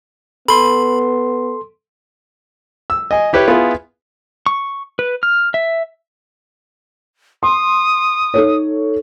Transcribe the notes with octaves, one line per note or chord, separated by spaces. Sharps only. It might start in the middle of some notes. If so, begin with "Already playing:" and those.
B3 A4 B5 C6
E6
D#5 G#5
E4 G4 B4 C#5
B3 E4 F4 G#4
C#6
B4
F6
E5
C6 D#6
D#4 A4 C#5